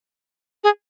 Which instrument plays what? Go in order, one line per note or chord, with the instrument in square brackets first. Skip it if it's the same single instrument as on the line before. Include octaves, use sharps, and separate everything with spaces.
[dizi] G#4